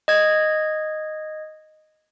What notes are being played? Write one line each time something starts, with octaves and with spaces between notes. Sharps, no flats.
D#5 G#6